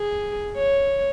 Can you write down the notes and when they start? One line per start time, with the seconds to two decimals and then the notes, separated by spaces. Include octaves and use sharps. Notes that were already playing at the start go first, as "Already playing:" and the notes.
Already playing: G#4
0.57 C#5